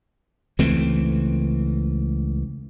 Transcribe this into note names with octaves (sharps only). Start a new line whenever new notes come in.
C#2 E3 A3 C4